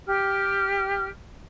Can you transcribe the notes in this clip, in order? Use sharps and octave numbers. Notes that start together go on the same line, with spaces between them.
G4 F6